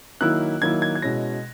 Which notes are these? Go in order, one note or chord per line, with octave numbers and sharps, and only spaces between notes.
D#3 F#3 A#3 E4 F#6
D#3 F#3 A#3 E4 G#6
G#6
G#6
B2 G#3 C#4 E4 A#6